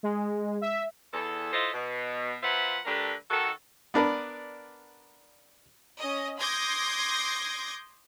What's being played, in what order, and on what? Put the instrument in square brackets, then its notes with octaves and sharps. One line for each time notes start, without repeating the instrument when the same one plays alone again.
[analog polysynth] G#3
E5
[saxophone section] E2 A4
E4 F4 A4 C5 D#5
B2
F#3 F4 B4 C5 E5 F#5
D3 A3 D4 G4 A#4 B4
D#3 F#4 A4
[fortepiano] B3 D4 A#4 B4 D5
[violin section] C#4 D#5
C6 D6 D#6 G6 G#6 A#6